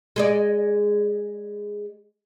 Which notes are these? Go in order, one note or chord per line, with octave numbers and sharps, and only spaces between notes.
G#3 G#4 D5